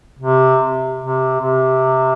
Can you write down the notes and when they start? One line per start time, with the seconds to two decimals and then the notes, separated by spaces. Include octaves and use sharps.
0.19 C3
1.00 C3
1.41 C3